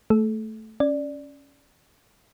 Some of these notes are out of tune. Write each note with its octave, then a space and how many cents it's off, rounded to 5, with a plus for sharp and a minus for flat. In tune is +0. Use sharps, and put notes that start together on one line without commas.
A3 +0 A4 -35
C#4 +0 D5 +0